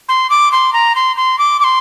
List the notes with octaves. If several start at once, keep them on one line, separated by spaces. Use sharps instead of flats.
C6
D6
C6
A#5
C6
C6
D6
D6
C6